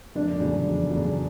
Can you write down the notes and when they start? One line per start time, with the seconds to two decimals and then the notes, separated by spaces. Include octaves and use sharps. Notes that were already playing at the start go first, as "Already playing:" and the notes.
0.15 F1 D4
0.40 E2 C#3 F#3
0.65 F1
0.90 E2 C#3 F#3